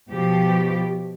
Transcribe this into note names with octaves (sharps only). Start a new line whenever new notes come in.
B2 F3 G4